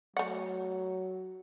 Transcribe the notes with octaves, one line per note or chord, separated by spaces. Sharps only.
F#3 A3 F#5